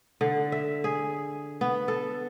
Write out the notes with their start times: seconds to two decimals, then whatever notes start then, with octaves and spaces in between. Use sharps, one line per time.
0.21 D3
0.52 E5
0.84 G#4
1.61 B3
1.88 A4